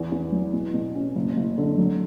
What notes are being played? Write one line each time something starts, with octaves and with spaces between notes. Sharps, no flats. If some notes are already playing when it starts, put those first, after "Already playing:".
Already playing: E2
E2
F#3
B2
B2
C#4
F#1
F#1
D3
F#3